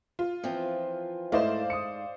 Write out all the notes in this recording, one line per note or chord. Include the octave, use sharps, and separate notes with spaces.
F4
E3 F3 C4
G#2 A3 E4 C5 D5 D#5 F5
D#6 C#7